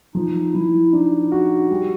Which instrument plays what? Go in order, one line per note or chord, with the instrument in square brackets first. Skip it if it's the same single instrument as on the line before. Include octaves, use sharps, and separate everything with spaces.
[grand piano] F3 [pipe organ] D#4
[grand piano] F3 [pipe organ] E4
[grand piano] D4 [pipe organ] D#4
[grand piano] F#4
G3